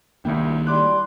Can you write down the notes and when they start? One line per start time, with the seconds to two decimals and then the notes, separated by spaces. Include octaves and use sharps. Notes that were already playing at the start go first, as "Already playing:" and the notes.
0.25 C2 D#3 A#3 D4 E4 G5
0.67 G3 E4 C6 D6 F#6